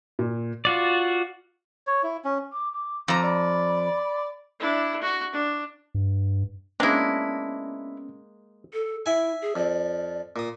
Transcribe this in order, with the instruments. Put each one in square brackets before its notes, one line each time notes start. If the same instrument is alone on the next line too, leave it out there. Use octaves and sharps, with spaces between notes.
[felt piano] A#2
[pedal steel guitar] F4 F#4 D5
[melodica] C#5
E4
C#4
[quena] D6
D6
[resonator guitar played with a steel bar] F2 A#5 [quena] D6
[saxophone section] D5 [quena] B5
[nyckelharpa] D4 E4
F#4
D4
[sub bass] G2
[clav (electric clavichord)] G#3 A#3 A#4 [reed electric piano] B3 C#4 [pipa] D4 E4
[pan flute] A4
[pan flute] E4 [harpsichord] E5 G#5
[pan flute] G#4
[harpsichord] F2 [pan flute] D5
[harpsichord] A#2 D#6